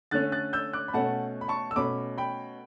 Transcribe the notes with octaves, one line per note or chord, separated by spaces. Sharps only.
D3 A3 C#4 F#6 A6
F#6 A6
E6 G6
D6 F#6
B5
B2 A3 C#4 F#5 A5
B5
A5 C#6
E6
B2 A3 C#4 B5 D6
G5 B5